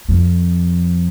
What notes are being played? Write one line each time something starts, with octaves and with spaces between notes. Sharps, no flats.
F2